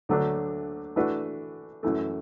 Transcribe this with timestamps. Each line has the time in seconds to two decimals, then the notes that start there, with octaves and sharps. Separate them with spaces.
0.09 D2 D3 F#3 A3 D4
0.96 E3 A3 D4 F#4 B4
1.83 F#2 E3 A3